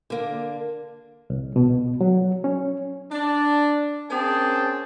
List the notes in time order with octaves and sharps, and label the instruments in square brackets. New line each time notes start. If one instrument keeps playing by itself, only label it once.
[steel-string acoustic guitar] D3 A#3
[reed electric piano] C2
B2
F#3
C#4
[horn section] D4
A#3 C4 C#4 G#4 G5 A5